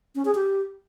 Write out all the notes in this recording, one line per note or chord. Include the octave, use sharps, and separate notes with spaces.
C#4
G#4
G4